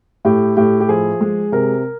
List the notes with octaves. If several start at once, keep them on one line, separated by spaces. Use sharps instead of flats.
A2 G4
A2 G4
G4
F3 G#4
G#3
C3 A#4